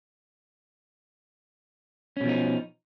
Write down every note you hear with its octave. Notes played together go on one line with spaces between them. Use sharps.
B2 F3 C#4 D#4